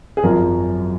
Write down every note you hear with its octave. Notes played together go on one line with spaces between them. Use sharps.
G#4
G#1 F#2 F3 A#4